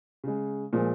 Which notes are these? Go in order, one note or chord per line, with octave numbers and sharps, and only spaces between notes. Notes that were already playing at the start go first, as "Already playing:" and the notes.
C#3 G#3
A#2 F3 G#3